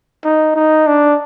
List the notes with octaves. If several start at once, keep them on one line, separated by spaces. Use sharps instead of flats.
D#4
D#4
D4